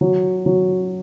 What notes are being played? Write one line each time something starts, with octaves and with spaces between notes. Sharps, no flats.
F#3
F#3